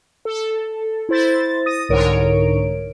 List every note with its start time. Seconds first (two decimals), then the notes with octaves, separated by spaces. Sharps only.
0.25 A4
1.09 E4 C5 A6
1.66 D#6 A#6 D#7
1.89 C2 G#2 D3 A#4 C#5 D7